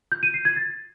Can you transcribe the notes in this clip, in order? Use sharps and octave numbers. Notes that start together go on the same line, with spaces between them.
G6
D#7
C7
G#6
A6